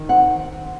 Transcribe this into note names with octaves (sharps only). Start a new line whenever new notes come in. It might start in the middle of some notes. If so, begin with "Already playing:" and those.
Already playing: D#3
C4 F#5